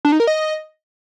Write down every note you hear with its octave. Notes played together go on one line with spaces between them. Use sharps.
D4
D#4
A#4
D#5